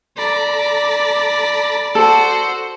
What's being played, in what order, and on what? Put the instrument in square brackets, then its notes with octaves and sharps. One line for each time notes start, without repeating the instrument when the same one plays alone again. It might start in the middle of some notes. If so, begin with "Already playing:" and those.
[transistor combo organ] A4 A#5 B5 [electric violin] D5
[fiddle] F#4 C5 [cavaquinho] A4